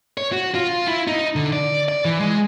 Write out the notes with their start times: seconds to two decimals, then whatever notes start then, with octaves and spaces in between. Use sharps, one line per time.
0.18 C#5
0.33 F#4
0.55 F4
0.88 E4
1.07 D#4
1.36 D3
1.53 D5
1.89 D5
2.05 E3
2.20 G#3